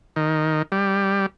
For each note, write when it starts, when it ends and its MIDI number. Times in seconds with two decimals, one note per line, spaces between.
0.16 0.62 51
0.72 1.26 55